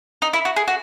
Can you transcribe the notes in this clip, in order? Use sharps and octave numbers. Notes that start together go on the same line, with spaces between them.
D#4
E4
F#4
G#4
F#4